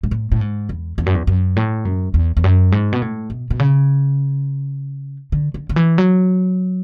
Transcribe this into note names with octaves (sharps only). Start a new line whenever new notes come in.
G#2
A2
A2
G#2
E2
E2
F#2
E2
F#2
A2
F#2
E2
E2
F#2
G#2
B2
A2
B2
B2
C#3
D3
D3
D3
E3
F#3